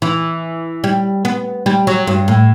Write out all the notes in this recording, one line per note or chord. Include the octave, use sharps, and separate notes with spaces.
E3
G3
B3
G3
F#3
G2
A2